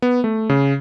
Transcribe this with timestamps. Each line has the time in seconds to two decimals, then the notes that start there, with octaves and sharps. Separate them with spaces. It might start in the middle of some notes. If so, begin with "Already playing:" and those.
0.02 B3
0.24 A3
0.49 C#3